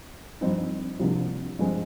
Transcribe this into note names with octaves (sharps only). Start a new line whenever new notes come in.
G2 F3 C4 D#4
C2 C3 F3 A#3 D4
G2 F3 G#3 C4